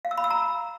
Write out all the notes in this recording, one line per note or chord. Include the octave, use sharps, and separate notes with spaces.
F5
E6
B5
E6
A#5